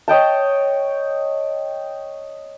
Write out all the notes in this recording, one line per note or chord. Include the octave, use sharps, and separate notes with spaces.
C#5 D#5 G5 A5